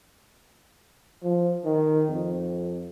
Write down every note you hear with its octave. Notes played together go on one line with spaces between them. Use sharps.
F3
D#3
F2